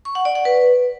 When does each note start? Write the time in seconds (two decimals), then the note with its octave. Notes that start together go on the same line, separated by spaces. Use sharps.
0.05 C#6
0.15 F#5
0.25 D5
0.35 F#5
0.45 B4